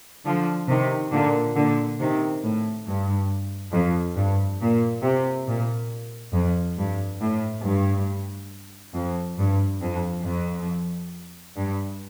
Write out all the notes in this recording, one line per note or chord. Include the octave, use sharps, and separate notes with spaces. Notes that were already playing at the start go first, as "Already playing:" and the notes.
D3 F3
C3 D#3
A#2 D3
A#2 D3
C3 D#3
A2
G2
F2
G2
A#2
C3
A#2
F2
G2
A2
G2
F2
G2
F2
F2
G2